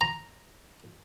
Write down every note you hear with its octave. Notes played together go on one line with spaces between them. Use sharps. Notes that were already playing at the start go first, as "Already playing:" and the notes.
A#5